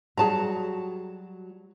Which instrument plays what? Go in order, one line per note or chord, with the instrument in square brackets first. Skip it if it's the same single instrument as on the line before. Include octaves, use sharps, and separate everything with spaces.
[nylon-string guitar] F#3 G3 F#4 [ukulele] G#4 A5 A#5